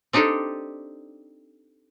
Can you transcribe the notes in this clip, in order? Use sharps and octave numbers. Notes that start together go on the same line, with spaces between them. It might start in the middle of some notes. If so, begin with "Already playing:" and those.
C4 D4 D#4 G4 A4